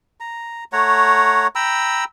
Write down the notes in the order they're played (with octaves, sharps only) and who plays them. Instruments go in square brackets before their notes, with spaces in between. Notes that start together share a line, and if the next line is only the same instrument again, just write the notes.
[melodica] A#5
A3 C#5 F#5 A#5
G5 A#5 B5 E6